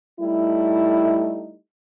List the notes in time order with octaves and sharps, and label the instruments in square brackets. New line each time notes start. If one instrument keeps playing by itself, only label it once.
[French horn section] G3 A3 D#4 E4